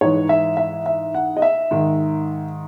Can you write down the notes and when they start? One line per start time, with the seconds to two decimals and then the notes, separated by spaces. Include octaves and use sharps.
0.01 G#2 E3 C#5
0.29 E5
0.57 E5
0.86 E5
1.15 F#5
1.37 D#5
1.42 E5
1.71 G#2 D#3